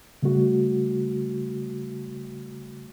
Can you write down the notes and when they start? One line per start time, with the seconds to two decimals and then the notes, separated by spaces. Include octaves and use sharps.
0.23 C#3 G3 A3 F#4